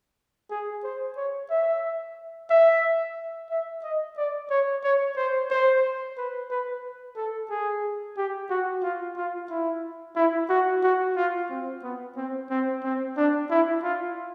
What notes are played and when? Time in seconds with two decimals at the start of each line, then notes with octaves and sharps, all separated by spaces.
0.51 G#4
0.84 C5
1.17 C#5
1.50 E5
2.50 E5
3.50 E5
3.83 D#5
4.17 D5
4.50 C#5
4.84 C#5
5.16 C5
5.50 C5
6.17 B4
6.51 B4
7.16 A4
7.50 G#4
8.17 G4
8.50 F#4
8.83 F4
9.17 F4
9.50 E4
10.16 E4
10.50 F#4
10.83 F#4
11.17 F4
11.50 C4
11.83 B3
12.17 C4
12.50 C4
12.84 C4
13.17 D4
13.50 E4
13.83 F4